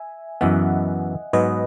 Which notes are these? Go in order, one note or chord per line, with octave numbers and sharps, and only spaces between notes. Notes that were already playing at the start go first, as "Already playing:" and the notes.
Already playing: E5 G#5
F#2 E3 B3 D#5 F#5
G#2 F#3 B3 B4 D#5